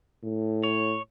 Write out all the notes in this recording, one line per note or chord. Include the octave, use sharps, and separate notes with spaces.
A2
C#5